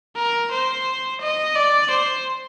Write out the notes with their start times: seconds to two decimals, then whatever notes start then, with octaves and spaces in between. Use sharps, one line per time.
0.16 A#4
0.51 C5
1.21 D#5
1.56 D5
1.91 C5